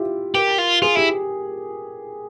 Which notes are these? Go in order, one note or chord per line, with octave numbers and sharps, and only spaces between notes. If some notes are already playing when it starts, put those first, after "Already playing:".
Already playing: E4 F4 G4
G4 A#4
F4
F4 G#4
E4 G4